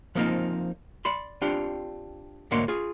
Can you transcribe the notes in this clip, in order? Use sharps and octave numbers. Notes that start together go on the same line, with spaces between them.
F3 G3 A#3 C4 D#4 F4
D5 B5 C6
C4 D4 F4 G4
D2 G#2 A#3 C#5 C6
F4 G#4